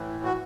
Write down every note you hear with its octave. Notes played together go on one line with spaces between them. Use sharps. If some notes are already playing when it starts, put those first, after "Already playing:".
Already playing: A2 E3
F#4